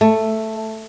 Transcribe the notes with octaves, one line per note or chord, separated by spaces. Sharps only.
A3